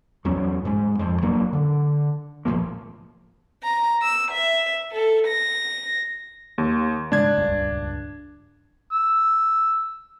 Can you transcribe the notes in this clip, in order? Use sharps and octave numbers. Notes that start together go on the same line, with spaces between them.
E2 F#3 C#4
G#2 G#3
F2 F3
E1 F#3 A#3 D4
D3
B1 A2 F3 A#3
A#5
E6
E5
A4
A#6
D#2
G#2 C#3 G#3 D4 G#6
D#1 C#2 G2
E6